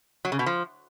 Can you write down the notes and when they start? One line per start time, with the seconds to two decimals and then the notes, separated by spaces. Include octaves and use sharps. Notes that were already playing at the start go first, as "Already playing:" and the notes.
0.25 F#3
0.32 C#3
0.39 B2
0.46 F3